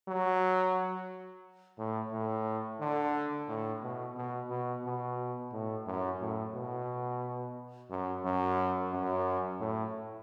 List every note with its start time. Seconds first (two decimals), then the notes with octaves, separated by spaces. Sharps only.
0.08 F#3
1.78 A2
2.12 A2
2.80 D3
3.49 A2
3.83 B2
4.16 B2
4.50 B2
4.85 B2
5.53 A2
5.87 F#2
6.21 A2
6.55 B2
7.90 F#2
8.25 F#2
8.93 F#2
9.60 A2